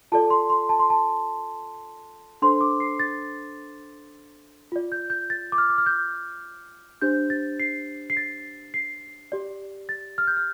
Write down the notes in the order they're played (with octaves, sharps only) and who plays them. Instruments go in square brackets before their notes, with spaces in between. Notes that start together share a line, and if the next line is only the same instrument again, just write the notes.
[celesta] F4 A4 D5 A5
C6
C6
A5
C6
A5
D4 A4 C5 C6
D6
C7
A6
F4 D5
G6
G6
A6
D6
F6
D6
F6
G6
D4 G4 C5 G6
A6
C7
C7
A6
C7
G4 D5
A6
F6
G6
F6